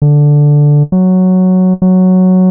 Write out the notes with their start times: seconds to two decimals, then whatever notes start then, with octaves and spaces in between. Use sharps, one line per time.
0.02 D3
0.92 F#3
1.82 F#3